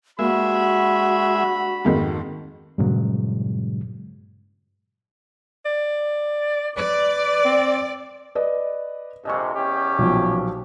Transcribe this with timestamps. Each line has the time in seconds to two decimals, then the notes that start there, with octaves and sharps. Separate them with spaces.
0.19 G2 G#3 A#3 F#4 E5 B5
1.85 F2 G#2 D#3
2.78 G2 A#2 C#3 F#3 G#3
5.66 D5
6.77 B4 D5
7.45 C4
8.35 B4 D5 D#5
9.25 A#1 F2 C3 D#5 G#5 C#6
9.55 E2 C#4 G4
9.99 B1 A#2 F3